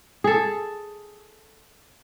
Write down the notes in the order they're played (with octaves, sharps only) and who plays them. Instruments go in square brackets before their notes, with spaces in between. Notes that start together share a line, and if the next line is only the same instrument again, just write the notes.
[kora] G#4 A4